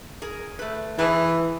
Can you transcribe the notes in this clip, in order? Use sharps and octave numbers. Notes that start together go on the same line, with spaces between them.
G#4 A#4
A3 B4
E3 G#4 E5 A5